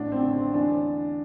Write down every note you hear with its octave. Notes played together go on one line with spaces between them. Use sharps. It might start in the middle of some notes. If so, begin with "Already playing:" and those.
Already playing: A1 D4
C4
D3
C4
E2 D4